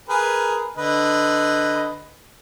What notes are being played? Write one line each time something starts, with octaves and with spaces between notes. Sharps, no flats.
G#4 A#4 B4
D3 B4 D#5